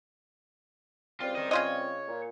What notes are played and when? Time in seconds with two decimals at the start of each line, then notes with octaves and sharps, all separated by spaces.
1.20 C#2 G3 C4 F4
1.35 A#4 D#5
1.51 C#3 F4 C#5 D#5
2.08 A#2